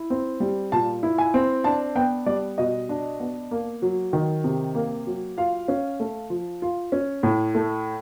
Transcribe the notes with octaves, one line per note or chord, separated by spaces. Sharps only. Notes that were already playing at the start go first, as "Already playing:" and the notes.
Already playing: E4
C4
G3
A#2 A5
E4
G#5
C4
D4 A5
B3 G5
G3 D5
B2 D#5
D4
B3
A#3
F#3
D#3
C3
A#3
F#3
F4 F5
C#4
A3
F3
F4
C#4
A2
A3